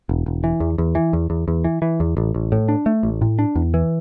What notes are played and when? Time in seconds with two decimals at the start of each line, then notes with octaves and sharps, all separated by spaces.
0.09 E1
0.26 E1
0.44 E3
0.60 E2
0.78 E2
0.95 E3
1.13 E2
1.30 E2
1.48 E2
1.64 E3
1.82 E3
2.00 E2
2.17 A1
2.34 A1
2.52 A2
2.69 D4
2.86 A3
3.03 A1
3.22 A2
3.39 D4
3.55 E2
3.74 E3